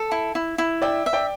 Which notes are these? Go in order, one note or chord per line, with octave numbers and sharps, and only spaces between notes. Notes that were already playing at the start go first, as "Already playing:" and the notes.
Already playing: A4
E4
E4
E4
D5 E5 G5
E5
D5 G5